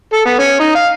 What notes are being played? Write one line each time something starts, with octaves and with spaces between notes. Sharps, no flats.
A4
B3
C#4
D#4
F5